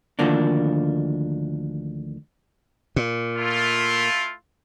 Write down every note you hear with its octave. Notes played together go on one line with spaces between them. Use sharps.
D2 D#3 F3 A#3 D4
A#2
A3 E4 F4